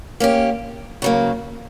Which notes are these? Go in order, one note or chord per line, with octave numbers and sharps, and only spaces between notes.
A#3 C#4 G4
C#3 F#3 A#3